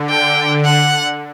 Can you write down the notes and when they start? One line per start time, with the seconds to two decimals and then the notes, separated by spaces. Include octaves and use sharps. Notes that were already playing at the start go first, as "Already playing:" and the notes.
Already playing: D3
0.09 G5
0.65 F#5